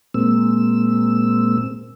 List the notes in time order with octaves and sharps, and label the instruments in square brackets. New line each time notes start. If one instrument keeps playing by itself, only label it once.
[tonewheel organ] A#2 G#3 A#3 C4 E6